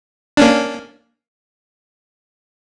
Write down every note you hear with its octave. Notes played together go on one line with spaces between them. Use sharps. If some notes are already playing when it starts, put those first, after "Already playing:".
A#3 C#4 D4